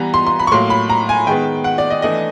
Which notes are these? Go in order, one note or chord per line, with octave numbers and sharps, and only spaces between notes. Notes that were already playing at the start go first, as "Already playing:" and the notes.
Already playing: E3 G3 B3 A#5
C6
C6
B5
C#6
A2 F#3 A#3 C6
B5
A#5
G#5
D#3 G#3 B3 G5
F#5
D5
D#5
E3 A3 D4 D#5